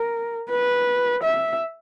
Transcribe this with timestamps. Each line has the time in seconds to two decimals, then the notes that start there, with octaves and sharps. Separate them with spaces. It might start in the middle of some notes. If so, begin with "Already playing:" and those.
Already playing: A#4
0.50 B4
1.24 E5